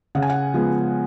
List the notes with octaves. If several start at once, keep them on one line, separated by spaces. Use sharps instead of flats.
C#3 F#5
G#5
F#5
F3 G#3 B3